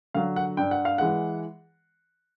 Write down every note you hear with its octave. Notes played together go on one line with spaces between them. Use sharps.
D3 F#3 F5
F#5
G2 G5
F#5
F5
E3 G#3 F#5